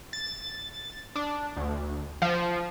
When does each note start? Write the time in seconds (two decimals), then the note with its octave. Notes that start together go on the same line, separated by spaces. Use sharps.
0.13 A6
1.16 D4
1.57 D2
2.22 F3